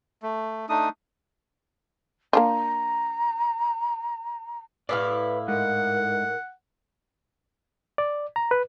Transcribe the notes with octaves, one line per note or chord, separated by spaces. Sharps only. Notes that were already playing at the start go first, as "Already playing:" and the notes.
A3
A3 D4 D#4 D#6
A#3 D4 F4 A#5
A2 E4 B4 D5 F5
G#2 A#4 F#5
D5
A#5
B4